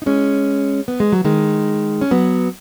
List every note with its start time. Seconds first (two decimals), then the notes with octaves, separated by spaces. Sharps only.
0.02 D#4
0.06 G#3 C#4
0.88 B3
1.00 G#3
1.12 F#3
1.25 D#3 G#3
2.01 C#4
2.11 F#3 B3